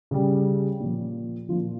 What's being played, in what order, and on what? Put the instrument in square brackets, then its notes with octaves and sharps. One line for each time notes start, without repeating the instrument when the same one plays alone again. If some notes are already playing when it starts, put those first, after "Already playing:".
[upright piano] C#3 G3
A#2 F3
F3 F4
A#2